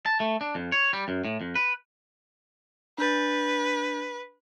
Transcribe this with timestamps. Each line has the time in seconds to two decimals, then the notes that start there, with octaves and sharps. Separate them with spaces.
0.06 A5
0.20 A3
0.41 D4
0.55 F2
0.72 C#5
0.93 G3
1.08 F#2
1.25 A2
1.41 F2
1.55 B4
2.98 D4 B4 G6 A6